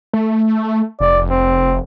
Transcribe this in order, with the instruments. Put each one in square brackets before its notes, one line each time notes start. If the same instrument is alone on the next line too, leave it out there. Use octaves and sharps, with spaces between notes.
[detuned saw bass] A3
[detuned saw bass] F1 [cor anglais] D5
[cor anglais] C4